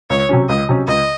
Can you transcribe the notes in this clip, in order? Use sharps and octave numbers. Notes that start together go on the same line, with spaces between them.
C#2 C#5
C3 F#3 C#4
C#2 D#5
C3 F#3 C#4
C#2 D#5